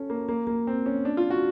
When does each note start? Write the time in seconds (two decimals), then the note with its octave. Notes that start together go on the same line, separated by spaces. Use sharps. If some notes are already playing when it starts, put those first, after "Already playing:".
Already playing: C#4 A4
0.10 A#3
0.29 A#3
0.47 A#3
0.67 C4
0.86 C#4
1.05 D4
1.17 F4
1.30 F#4